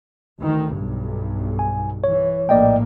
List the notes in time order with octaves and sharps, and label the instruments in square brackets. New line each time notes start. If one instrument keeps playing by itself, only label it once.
[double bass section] D2 D#3
B1 G2
[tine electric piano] G#5
[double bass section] E3 [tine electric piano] C#5
[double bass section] A#1 A2 A#3 [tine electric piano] D5 D#5 G5